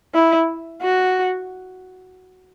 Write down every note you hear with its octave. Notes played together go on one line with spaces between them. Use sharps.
E4
F#4